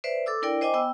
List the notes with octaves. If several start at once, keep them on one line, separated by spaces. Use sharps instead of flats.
B4 C5 D5 E5
A4 D6 E6
D4 E4 A#4 D5 G5
C5 D#5 G5 G#5 D6
B3 G5 E6